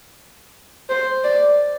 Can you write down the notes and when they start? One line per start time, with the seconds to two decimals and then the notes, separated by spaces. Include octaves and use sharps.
0.89 C5
1.24 D5